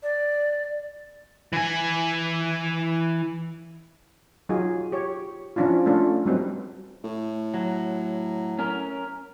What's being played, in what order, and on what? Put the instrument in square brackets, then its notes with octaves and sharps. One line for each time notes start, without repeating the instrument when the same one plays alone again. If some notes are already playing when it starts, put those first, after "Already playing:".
[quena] D5
[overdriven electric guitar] E3 G#5
[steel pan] F#3 D#4 F4 G#4
G4 C#5
F3 C#4 D4 E4 F4
A3 C#4 D4 F4
F#3 G3 C4 D#4 B4
[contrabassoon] A2
[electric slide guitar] F#3
C#4 A#4